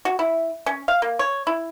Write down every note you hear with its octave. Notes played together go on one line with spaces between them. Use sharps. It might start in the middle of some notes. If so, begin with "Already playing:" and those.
F#4
E4
C#4
F5
A#3
C#5
E4